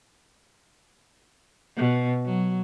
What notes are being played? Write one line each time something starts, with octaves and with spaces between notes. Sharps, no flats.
B2
F#3